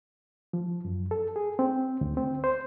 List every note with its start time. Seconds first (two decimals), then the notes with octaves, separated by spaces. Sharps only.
0.53 F3
0.85 F#2
1.11 A4
1.36 G#4
1.59 C4
2.01 D2
2.17 C4
2.44 C5